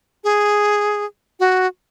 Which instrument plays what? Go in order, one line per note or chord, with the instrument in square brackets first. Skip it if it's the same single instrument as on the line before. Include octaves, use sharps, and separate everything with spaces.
[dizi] G#4
F#4